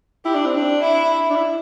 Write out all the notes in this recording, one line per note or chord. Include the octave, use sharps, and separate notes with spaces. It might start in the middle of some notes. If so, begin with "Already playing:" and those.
E4 G4
D4
C4
D4
E4
D4
E4